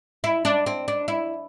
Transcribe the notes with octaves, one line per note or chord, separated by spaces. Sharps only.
E4
D4
C4
D4
E4